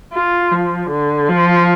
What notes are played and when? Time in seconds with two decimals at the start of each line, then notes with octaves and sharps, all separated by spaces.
0.14 F4
0.52 F3
0.90 D3
1.29 F3